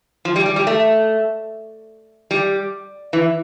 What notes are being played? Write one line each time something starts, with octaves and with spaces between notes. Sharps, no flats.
F3
G3
G3
G3
A3
G3
E3